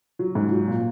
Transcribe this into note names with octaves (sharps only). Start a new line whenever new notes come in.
F#3
G#2
F#3
A#2